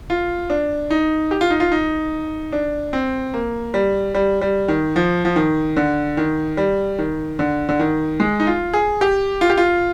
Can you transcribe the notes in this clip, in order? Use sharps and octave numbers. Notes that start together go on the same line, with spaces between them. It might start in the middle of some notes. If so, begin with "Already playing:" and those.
F4
D4
D#4
G4
F4
D#4
F4
D#4
D4
C4
A#3
G3
G3
G3
D#3
F3
F3
D#3
D3
D#3
G3
D#3
D3
D3
D#3
G#3
D#4
F4
G#4
G4
F4
G4
F4